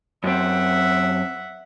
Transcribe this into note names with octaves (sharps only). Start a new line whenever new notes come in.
F#2 C4 E5 F#5